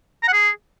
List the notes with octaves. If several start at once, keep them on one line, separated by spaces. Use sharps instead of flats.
A#5
F#5
G#4